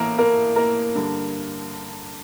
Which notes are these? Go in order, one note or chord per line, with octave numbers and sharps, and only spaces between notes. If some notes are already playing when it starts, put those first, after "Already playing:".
Already playing: A2 E3 A#3 A#4
A#3 A#4
A#3 A#4
G2 D3